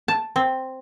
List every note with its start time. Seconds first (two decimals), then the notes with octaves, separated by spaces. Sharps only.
0.08 A5
0.36 C4